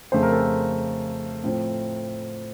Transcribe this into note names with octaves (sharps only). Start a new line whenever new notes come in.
F2 C#3 A3 C5
A#4
A4
A#4
A2 F3 A3 C4